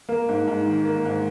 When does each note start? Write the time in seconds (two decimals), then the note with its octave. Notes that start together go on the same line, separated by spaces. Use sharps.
0.09 A#3
0.28 G#2
0.47 G#2
0.66 D#3
0.85 A#3
1.05 G#2